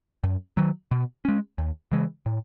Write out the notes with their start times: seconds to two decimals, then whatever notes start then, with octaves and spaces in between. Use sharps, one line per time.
0.24 F#2
0.57 D#3 F#3
0.91 B2
1.25 G#3 C#4
1.58 D#2
1.92 C#3 E3 G#3
2.26 A2